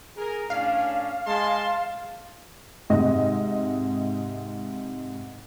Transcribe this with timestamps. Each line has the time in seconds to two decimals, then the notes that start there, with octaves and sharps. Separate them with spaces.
0.17 G#4 A#4
0.50 A2 C#4 D4 F5
1.27 G#3 A5 C6
2.90 G#2 C3 D#5